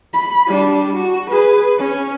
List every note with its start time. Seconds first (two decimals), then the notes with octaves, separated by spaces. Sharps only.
0.13 B5
0.47 G3 D4
0.96 F#4
1.30 G#4 B4
1.78 C#4